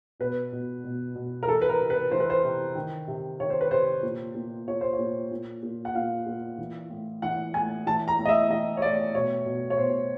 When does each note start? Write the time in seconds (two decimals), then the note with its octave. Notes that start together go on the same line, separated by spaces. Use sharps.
0.20 B2 B4
0.52 B2
0.84 B2
1.15 B2
1.43 A#4
1.47 E3 A4
1.62 B4
1.69 A#4
1.80 C3
1.90 B4
2.11 E3 C5
2.20 B4
2.30 C5
2.44 C3
2.75 D#3
3.08 C3
3.40 D#3 C#5
3.50 C5
3.61 B4
3.71 C3 C5
4.03 A#2
4.35 A#2
4.67 A#2 C#5
4.81 C5
4.93 C#5
4.98 A#2
5.31 A#2
5.63 A#2
5.85 F#5
5.95 A#2 F5
6.26 A#2
6.58 E3
6.90 A2
7.22 E3 F#5
7.54 A2 G#5
7.86 E3 A5
8.08 A#5
8.19 A2
8.25 D#5
8.29 E5
8.50 E3 D#5
8.77 C#5
8.82 A2 D5
9.15 B2 C#5
9.46 B2
9.70 C#5
9.78 B2 C5